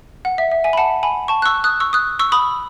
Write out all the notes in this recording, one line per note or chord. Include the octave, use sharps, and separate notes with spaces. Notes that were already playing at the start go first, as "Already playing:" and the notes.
F#5
E5
E5
E5 G#5
B5
F#5 A5
G#5 B5
A5 C#6
F#6
C#6 E6
D#6 F#6
C#6 E6
D#6 F#6
C#6 E6
B5 D#6